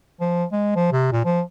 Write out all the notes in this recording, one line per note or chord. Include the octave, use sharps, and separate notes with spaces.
F3
G#3
F3
C3
A#2
F3